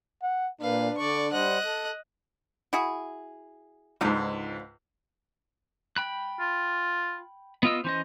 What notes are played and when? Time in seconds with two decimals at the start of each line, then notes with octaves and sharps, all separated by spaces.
0.23 F#5
0.61 A#2 A#3 D4 B4 F5
0.97 D3 D5 C#6
1.32 G3 C5 D#5 F#5 F#6
1.64 A4
2.73 E4 F#4 G#4
4.01 C#2 G#2 D3 F3 D#4
5.96 G5 B5 F#6
6.40 F4
7.63 B3 F4 D#5 E6
7.84 E3 C#4 C5 D#5